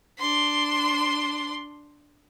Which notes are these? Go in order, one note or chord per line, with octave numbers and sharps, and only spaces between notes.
D4 C6